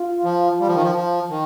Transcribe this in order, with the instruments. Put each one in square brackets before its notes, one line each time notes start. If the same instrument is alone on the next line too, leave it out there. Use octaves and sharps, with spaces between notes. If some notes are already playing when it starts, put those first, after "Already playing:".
Already playing: [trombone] F4
[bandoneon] F3
G3
F3
D#3
F3
F3
D#3